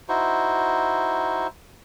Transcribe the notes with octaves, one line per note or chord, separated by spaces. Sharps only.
D#4 E4 F#4 C5